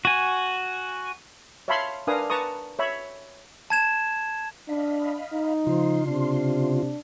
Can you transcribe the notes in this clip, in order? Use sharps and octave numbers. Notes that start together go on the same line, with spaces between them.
F#4 G#5
C#5 E5 F5 A5 B5 C6
D4 A#4 B4 F5 G#5 D#6
B4 A5 A#5 C#6 D#6
C#5 E5 B5
A5 G#6 E7
D4 D#5 F5 B5
D#4
C#3 F3 F4 C6
C3 D4